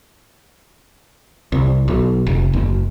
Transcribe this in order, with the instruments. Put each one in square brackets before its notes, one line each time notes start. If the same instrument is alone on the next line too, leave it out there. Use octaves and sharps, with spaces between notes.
[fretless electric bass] C2
B1
F1
F#1